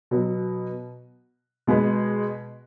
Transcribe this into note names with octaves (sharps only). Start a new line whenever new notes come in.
B2 F#3 B3
B2 G#3 B3